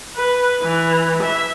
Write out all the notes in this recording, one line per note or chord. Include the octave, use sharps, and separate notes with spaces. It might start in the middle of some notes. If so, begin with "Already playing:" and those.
B4
E3
E5